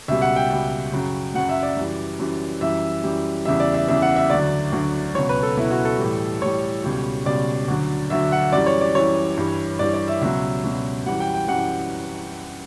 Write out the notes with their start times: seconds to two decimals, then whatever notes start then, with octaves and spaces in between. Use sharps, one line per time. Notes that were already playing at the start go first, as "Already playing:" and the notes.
0.08 C#2 B2 G3 E5
0.22 F#5
0.36 G5
0.50 C#2 B2 G3
0.92 F#2 C#3 F#3
1.34 F#2 C#3 F#3 F#5
1.49 E5
1.63 D5
1.77 F#2 E3 G3
2.19 F#2 E3 G3
2.61 F#2 E3 G3 E5
3.04 F#2 E3 G3
3.46 E2 C#3 E3 G3 E5
3.60 D5
3.74 E5
3.88 E2 C#3 E3 G3 E5
4.02 F#5
4.16 E5
4.30 D2 D3 F#3 D5
4.72 D2 D3 F#3
5.15 C#2 B2 F#3 C#5
5.29 B4
5.43 A4
5.57 C#2 B2 F#3 E4
5.71 F#4
5.85 A4
5.99 A2 E3 G3
6.41 A2 E3 G3 C#5
6.84 C#2 B2 G3
7.26 C#2 B2 G3 D5
7.68 D2 D3 F#3
8.10 D2 D3 F#3 E5
8.32 F#5
8.52 F#2 E3 G3 D5
8.66 C#5
8.81 D5
8.95 F#2 E3 G3 C#5
9.37 G2 E3 G3
9.79 G2 E3 G3 D5
9.94 D5
10.08 E5
10.21 C#2 B2 F#3 E5
10.64 C#2 B2 F#3
11.06 F#2 E3 G3 F#5
11.20 G5
11.34 G5
11.48 F#2 E3 G3 F#5